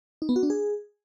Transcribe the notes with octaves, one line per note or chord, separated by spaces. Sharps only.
D#4
B3
F#4
D4
G#4